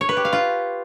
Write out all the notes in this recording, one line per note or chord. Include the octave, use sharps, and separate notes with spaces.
C#5
B4
G4
F5
F4